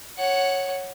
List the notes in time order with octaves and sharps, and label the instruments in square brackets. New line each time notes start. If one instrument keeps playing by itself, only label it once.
[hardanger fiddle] C#5 F#5